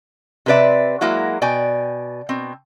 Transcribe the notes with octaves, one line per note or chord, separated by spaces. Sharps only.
C3 C4 B4 D5 E5
F#3 G#3 A#3 E4 F#4
B2 D5 G5 G#5
B2 C4